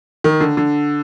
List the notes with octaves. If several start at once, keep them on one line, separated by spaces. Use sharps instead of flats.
D#3
D3
D3